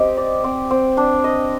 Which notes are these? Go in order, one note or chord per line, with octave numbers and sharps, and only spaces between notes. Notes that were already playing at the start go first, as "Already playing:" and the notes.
Already playing: C4 G4 D#5
D5
C4
C4
D4
D#5